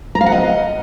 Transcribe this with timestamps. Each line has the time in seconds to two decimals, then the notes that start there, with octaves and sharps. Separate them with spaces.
0.15 A#5
0.21 F5
0.26 F#5
0.32 D#5